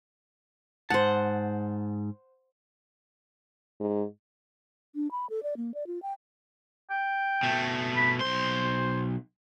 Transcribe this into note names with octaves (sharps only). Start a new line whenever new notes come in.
G#2 C5 F#5 A5
G#2
D4
B5
A4
D5
A#3
D5
F4
G5
G5
B2 A3
B5
B1 C5 C6